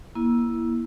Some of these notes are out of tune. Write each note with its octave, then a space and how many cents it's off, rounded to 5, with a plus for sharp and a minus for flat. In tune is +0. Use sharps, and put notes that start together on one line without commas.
A#3 +30 E4 +0